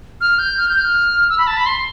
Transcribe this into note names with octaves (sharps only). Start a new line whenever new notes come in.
F6
G6
F6
G6
F6
E6
B5
A5
B5
C6